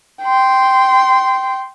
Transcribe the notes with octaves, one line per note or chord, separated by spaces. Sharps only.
G5 C6